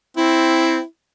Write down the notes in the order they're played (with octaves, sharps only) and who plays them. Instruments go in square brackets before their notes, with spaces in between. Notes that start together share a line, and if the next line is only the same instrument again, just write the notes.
[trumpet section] C4 [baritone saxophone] E4